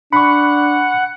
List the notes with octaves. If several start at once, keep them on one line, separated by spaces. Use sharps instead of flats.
D4 F#5 B5 C#6